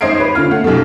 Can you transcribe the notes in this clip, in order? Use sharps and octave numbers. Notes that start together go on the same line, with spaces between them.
G#1 C5 D#5 G#6 C7 D7
B4 C#5
D3 F4 F6
A3 F#5
B1 F#2 B2 G3 A3